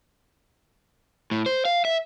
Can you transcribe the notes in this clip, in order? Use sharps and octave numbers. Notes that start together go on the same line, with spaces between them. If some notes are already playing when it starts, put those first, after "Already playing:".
A2
C5
F5
E5